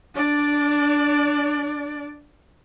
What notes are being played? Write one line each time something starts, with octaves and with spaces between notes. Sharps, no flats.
D4 D5